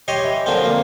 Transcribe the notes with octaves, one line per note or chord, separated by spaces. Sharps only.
G4 C#5 D#5 C6
E3
A#2 D3 F3 F#3 C4
A#3